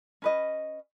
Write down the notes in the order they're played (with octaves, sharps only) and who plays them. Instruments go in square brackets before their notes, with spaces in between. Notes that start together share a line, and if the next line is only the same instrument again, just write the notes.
[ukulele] C#4 B4 D#5